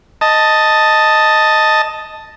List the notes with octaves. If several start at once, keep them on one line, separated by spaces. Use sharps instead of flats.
D#5 A5